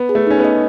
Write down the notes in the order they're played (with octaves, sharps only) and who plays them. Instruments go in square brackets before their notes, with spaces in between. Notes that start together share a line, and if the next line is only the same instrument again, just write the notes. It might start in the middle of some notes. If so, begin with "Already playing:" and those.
Already playing: [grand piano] B3
[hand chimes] G#4
[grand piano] A3
[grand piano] C#4 [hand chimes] D#4
[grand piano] B3
[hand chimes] D#5